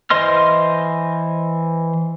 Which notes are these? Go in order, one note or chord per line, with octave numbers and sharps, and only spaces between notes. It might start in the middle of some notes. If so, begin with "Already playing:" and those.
E3 C5 D#5 C6 F6